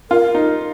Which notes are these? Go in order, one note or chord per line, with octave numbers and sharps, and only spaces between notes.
F4 A#4
D#4